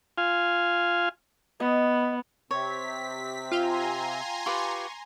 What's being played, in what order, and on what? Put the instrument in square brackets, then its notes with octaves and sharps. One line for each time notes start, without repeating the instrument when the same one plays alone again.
[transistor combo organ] F4 F5 G#5
[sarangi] B3 [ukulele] D#5
[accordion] C3 C4 [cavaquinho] C#5 [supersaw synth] B6
[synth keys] F4 F5 G5 [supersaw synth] G#5 A#5 C6
[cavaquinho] F4 G4 B4 [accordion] C#6